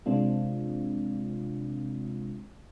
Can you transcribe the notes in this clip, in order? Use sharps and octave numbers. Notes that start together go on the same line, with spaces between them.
C3 G#3 C4 D4 F4